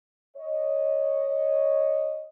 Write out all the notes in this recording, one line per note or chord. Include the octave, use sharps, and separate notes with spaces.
C#5 D#5